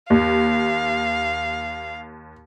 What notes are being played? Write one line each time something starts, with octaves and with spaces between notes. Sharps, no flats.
D#2 F5